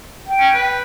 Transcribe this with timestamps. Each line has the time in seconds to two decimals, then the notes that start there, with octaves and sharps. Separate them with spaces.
0.26 G5
0.40 C#4
0.54 B4